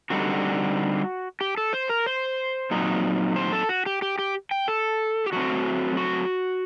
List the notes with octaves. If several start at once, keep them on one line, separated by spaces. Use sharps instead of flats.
D3 G3 C4 D#4 F#4
G4
A4
C5
A#4
C5
A#2 F#3 C4 D#4
C5
A4
F#4
G4
G4
G4
G5
A4
G4
F#3 A3 C4 F#4
F#4